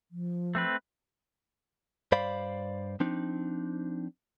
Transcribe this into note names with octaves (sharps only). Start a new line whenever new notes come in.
F3
A3 C4 B4
G2 C5 D5 F5 B5
F3 C4 D4 D#4